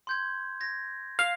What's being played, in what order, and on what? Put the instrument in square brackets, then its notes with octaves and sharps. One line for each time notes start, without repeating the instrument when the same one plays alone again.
[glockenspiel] C6 G6 G#6
G#6 A#6
[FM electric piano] F5